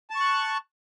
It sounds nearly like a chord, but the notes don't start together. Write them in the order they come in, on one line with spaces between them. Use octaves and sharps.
A5 C#6 F#6